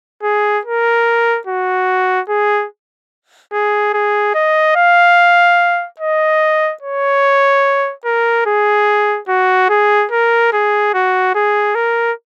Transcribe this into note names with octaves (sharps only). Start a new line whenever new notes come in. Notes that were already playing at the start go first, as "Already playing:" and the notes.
G#4
A#4
F#4
G#4
G#4
G#4
D#5
F5
D#5
C#5
A#4
G#4
F#4
G#4
A#4
G#4
F#4
G#4
A#4